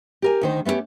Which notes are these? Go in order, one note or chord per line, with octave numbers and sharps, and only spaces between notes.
G4 A#4 G#5
D2 D#3 C5
A3 B3 C#4 D4 G4